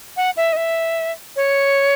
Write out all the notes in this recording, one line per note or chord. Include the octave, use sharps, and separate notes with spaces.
F#5
E5
D#5
E5
C#5